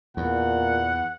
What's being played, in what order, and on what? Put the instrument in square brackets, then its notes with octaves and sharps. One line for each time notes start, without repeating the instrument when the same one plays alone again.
[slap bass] E2 [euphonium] A#2 [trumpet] F#5